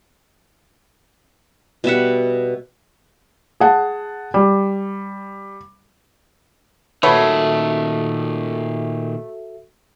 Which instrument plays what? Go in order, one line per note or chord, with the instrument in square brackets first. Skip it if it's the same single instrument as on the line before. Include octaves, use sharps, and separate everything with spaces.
[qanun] B2 G3 E5 F#5
[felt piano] G#4 F#5 A5
G3
[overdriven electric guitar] A#2 D#3 [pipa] A3 B3 C#5 [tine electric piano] F#4 A4 E5